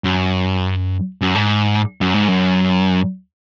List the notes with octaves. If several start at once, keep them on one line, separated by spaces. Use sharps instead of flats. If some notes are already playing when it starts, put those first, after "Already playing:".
F#2
F#2
G#2
F#2
G#2
F#2